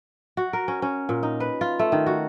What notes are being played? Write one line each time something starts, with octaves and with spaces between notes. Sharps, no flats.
F#4
A#4
C#4
C#4
A#2
D#4
B4
F4
A3
D#3
F#4